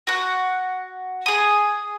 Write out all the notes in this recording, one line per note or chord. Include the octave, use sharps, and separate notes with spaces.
F#4 F#5
G#4 D#6